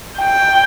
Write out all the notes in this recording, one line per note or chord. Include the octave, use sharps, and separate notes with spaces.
G5